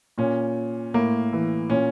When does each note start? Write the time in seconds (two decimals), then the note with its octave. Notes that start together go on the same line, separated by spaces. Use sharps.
0.18 A#2 C#4
0.94 A2 A#3
1.33 E3
1.70 A#2 C#4